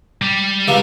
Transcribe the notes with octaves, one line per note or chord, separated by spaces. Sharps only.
G3
C#2 C3 A#3